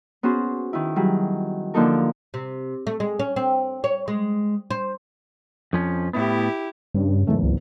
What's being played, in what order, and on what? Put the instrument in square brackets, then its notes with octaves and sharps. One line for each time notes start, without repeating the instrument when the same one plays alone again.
[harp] B3 C#4 F#4 G#4 C5
D#3 E4
F#3 G3 G#4
D3 F3 A#3 D#4 A4 A#4
[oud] C3
A3
G#3
C#4
C4
C#5
G#3
C5
[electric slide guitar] F2 F3 C#4
[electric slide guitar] A2 B3 [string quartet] E4 G4
[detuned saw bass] G2 [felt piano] C#3
[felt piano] F#1 E2 G#2 [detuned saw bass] A3
[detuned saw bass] C#2